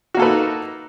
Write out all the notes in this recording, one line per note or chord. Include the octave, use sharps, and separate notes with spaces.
A#3 D#4 F#4 A4 B4